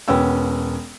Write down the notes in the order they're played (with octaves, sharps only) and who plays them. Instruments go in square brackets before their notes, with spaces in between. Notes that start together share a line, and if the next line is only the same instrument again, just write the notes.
[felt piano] E1 B3 C#4 G5 E6